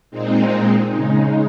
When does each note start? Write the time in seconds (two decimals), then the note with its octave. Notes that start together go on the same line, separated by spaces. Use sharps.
0.11 A#2 G#3 C4 D#4
0.88 C#3 G#3 D#4